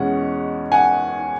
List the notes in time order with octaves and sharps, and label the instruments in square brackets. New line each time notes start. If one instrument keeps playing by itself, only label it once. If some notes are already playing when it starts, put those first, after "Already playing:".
Already playing: [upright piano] E2 B2 G#3 C#4 F#5
F#5 G#5